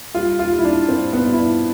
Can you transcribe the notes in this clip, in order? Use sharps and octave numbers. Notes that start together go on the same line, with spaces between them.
G3 F4
F4
G3
E4
D4
G2 C4
B3
G2
E4
D4